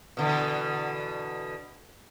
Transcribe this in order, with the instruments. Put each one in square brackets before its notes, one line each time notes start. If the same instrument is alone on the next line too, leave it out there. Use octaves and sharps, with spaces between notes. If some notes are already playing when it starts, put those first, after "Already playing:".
[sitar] B2 D3 E3